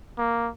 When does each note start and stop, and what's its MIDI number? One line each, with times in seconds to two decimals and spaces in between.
0.18 0.50 58